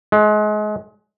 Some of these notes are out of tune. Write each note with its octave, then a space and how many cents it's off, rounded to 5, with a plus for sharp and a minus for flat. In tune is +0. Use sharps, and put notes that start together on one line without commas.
G#3 +30